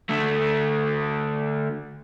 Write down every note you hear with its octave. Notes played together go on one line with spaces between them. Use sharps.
D3 A3